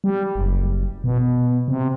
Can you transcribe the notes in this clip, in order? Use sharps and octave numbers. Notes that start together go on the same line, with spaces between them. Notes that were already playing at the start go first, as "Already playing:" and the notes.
G3
F#1
B2
C3